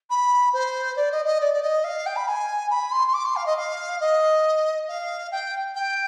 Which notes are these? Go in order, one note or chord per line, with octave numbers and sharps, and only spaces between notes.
B5
C5
D5
D#5
D#5
D5
D5
D#5
F5
G5
B5
G#5
B5
C6
C6
D6
C6
F5
D#5
F5
D#5
F5
G5
G5